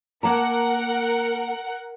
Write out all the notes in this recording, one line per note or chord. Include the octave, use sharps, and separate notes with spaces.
A#3 A#4 F#5 A5 A#5